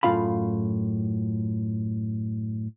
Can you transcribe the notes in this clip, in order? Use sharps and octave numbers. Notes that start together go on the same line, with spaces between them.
F#2 A2 B3 F4 F5 B5